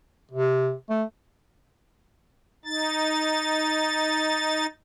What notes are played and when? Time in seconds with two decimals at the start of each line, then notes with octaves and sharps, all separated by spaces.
0.32 C3
0.90 A3
2.65 D#4 A6